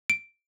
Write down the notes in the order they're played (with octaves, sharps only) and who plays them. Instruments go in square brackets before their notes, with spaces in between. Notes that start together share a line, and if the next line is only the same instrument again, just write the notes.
[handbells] D7